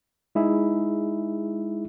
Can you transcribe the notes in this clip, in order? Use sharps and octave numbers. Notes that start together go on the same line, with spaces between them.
G#3 D#4 E4 G#4 E5